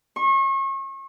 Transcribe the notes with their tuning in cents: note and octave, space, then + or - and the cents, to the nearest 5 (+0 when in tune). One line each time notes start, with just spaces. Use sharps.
C#6 -35